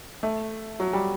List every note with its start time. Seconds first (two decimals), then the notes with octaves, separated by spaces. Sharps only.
0.23 A3
0.80 F#3
0.93 G3